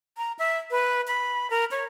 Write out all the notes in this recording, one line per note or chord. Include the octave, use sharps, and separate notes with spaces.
A#5
E5
B4
B5
A#4
C#5